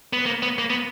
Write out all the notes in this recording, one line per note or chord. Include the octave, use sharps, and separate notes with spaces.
B3
A#3
B3
A#3
B3